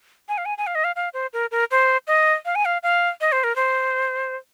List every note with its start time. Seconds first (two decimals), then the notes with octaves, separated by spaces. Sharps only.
0.29 G#5
0.38 F5
0.45 G#5
0.58 G#5
0.67 F5
0.75 D#5
0.84 F5
0.96 F5
1.14 C5
1.33 A#4
1.51 A#4
1.71 C5
2.07 D#5
2.45 F5
2.55 G#5
2.65 F5
2.83 F5
3.21 D#5
3.32 C5
3.44 A#4
3.56 C5